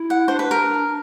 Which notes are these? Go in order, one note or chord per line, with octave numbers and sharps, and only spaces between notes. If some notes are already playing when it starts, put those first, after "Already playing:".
Already playing: E4
F#5
D4 C5
B4
A#4